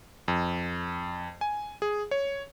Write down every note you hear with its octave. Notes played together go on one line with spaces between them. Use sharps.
F2
G#5
G#4
C#5